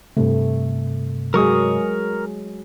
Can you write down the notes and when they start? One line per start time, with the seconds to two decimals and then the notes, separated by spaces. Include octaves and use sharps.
0.17 G2 C3 A3
1.34 F#3 G#3 G#4 A#4 C#6 D#6